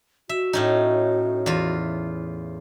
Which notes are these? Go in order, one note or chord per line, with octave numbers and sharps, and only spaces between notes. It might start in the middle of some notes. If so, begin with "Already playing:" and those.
F#4 E5
A2 C#4 D#4
E2 F4